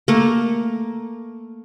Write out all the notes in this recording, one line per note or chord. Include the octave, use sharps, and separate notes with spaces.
A3 A#3